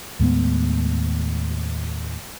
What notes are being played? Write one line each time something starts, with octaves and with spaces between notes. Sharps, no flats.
D#2 A2 G#3 B3